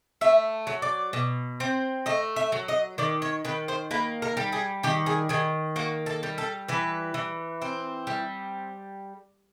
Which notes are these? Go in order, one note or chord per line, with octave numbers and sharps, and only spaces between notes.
A3 E5
F#3
D5
B2
C4
A3 D#5
E5
F#3
D#5
D#3 D5
C#5
D#3 B4
C5
A#3 B4
A#4
G3
G#4
D#3 G4
G#4
D#3 G#4
A#3 F#4
A4
G3
A4
E3 B4
E3
C4
G3